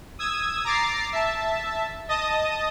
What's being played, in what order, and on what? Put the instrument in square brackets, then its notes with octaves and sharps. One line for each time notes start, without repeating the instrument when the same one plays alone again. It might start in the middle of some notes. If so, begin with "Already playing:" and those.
[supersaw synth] D#6 E6 G#6
A#5 D6 A6 C7
E5 A5
D#5 A5 D#6